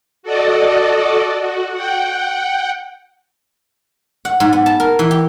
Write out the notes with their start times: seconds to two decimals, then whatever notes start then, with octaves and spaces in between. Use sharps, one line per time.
0.23 F#4 A4 D5 D#5
1.41 F#4
1.73 F#5 G5
4.25 F#5
4.40 G#2
4.53 B3
4.66 A5
4.80 A#4
4.99 E3
5.11 G4